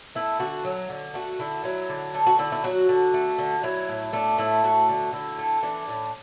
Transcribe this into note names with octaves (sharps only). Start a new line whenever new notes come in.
A3 E4
D3 F#4
F#3
D3
A3 F#4
D3 E4
F#3 E4
D3
A3 D4
F#4
D3 E4
E4
F#3 F#4
D3
A3
D3
F#3 E4
A2
A3 D4
A2 E4
A3 F#4
D3
D3 E4
A3
E3 D4
A2